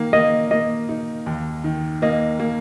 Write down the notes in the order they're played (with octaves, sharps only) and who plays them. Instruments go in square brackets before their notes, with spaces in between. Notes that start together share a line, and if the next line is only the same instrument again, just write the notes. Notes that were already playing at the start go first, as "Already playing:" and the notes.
Already playing: [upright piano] D#3 A#3
[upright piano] A#3 [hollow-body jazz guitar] D#5
[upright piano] A#3 [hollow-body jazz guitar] D#5
[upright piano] D#4
D#2
D#3
[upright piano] A#3 [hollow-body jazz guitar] D#5
[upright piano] A#3